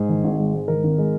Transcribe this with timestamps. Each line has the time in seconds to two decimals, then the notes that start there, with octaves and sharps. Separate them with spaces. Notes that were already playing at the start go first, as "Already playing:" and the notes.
Already playing: G#2 G#4
0.09 D#3
0.24 G#1
0.39 G#3
0.53 G#2
0.68 D#3 A#4
0.84 G#1
0.98 G#3